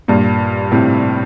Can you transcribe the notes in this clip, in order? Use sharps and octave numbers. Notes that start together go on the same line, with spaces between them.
G2 A#2
A2 C3